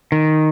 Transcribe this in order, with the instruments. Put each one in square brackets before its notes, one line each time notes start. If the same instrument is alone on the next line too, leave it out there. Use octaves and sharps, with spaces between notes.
[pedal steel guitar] D#3